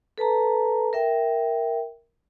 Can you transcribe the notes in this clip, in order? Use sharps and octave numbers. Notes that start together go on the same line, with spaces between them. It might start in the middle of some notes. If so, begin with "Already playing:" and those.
A4 B4 A5 A#5
A#4 E5 G5